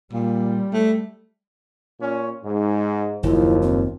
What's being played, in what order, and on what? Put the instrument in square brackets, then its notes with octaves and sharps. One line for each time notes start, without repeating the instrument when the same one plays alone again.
[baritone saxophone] A#2 [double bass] G3
[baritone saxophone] A3
[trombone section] A#2 C#4
G#2
[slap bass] F#1 [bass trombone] D#2 [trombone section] F3 [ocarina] E4
[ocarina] C4